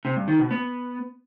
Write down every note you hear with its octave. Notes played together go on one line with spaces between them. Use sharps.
C3
G2
D#3
B2
B3